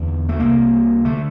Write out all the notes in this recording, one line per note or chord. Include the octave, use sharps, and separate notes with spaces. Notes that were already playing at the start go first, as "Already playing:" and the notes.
Already playing: E2 D3
A3
C2 C3 A#3
D3 A3